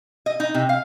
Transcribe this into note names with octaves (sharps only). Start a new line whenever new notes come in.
D#5
D#4
C3
F5